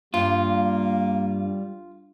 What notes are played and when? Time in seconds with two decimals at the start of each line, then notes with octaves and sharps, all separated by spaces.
0.14 G2 G3 A#3 F4